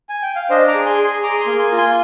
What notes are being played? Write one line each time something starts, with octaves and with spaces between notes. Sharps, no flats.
G#5
G5
F5
D4 C5 D#5
A#5 D6
G#4
G#5 C6
G#4
G#5 C6
G#4 A#5 D6
G#5 C6
A#3
G#5 C6
F4
G#5 C6